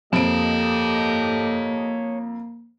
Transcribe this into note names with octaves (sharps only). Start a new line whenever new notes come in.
F2 A#3 G4 A4 C#5 D#5 A5 D7